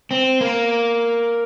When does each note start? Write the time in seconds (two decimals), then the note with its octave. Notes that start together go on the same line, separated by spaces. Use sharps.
0.11 C4
0.41 A#3